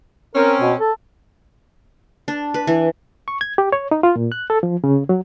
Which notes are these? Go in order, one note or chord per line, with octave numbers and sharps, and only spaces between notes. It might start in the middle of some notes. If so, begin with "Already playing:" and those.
C4 C#4 A#4
B2
A4
D4
B4
E3
C#6
G#6
G4
C#5
D#4
F4
A#2
F#6
A4
F3
C#3
F#3